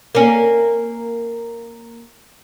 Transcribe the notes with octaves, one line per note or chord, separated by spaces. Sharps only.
A#3 C#4